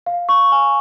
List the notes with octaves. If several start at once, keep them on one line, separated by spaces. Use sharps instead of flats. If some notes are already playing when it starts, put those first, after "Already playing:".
F5
C#6
G#5